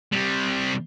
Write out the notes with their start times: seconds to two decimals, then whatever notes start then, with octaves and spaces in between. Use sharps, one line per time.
0.12 C3 G3